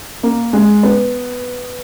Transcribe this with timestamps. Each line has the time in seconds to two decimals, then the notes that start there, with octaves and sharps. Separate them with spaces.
0.23 A#3
0.53 G#3
0.83 B3